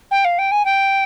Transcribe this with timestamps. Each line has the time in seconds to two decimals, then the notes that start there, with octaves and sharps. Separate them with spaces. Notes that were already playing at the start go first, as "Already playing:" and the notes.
0.11 G5
0.24 F5
0.38 G5
0.51 G#5
0.65 G5